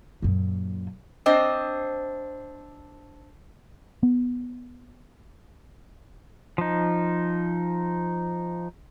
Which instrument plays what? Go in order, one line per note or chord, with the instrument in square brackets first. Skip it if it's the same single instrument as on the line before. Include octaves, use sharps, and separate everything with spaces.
[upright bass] F#2 A#2
[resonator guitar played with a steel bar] C4 D4 C5 D#5
[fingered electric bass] B3
[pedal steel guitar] F3 D#4